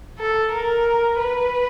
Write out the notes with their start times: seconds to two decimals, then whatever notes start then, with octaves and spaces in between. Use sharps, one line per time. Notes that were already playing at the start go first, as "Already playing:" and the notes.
0.18 A4
0.52 A#4
1.19 B4